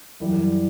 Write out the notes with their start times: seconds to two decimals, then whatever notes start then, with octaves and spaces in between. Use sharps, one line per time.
0.20 F#2 E3 G3